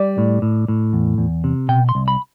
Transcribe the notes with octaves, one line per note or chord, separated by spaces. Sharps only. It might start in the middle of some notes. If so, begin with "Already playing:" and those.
Already playing: G3 D5
A2
A2
A2
E2
E2
C3
B2 G5
C6
C2
B5